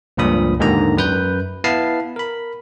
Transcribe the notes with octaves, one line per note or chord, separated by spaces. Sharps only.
C#2 G2 A#2 F3 B5 D#6
D#2 G#2 D3 D#3 A#5
F#2 B4 G6
B3 E4 F5 A5 C7
A#4 B5